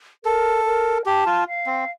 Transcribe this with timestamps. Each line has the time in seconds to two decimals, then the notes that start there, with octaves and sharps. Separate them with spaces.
0.24 A4 A#4
0.66 A#4
1.06 G4 A5
1.26 F4
1.47 F5
1.66 C4